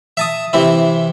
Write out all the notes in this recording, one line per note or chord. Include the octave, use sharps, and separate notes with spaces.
E5 A5 D#6
C3 E3 C4 E4